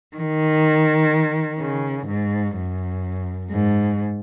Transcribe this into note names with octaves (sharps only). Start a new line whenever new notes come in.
D#3
C#3
G#2
F#2
G#2